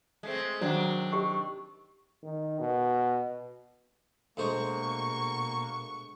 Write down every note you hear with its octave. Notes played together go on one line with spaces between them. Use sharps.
G#3 A3 C4
C3 D#3 F#3 D4
G4 D#5 C#6
D#3
B2
D2 B2 G#3 A#3 C5 C#6